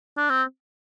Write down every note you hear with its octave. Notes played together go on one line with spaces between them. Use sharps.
D4
C4